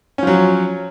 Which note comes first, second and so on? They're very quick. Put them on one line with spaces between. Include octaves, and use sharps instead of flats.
C#4 F3 F#3